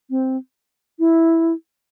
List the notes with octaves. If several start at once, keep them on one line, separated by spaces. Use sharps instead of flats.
C4
E4